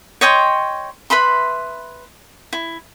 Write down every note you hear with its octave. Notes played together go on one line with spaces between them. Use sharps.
C#5 D#5 G5 C6
B4 E5 B5 C6
E4